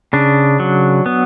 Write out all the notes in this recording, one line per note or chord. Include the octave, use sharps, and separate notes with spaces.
C#3 D4
F#3
B3